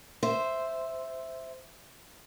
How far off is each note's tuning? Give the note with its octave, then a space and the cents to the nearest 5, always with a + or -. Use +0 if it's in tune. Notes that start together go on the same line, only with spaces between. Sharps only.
C5 +0 E5 +0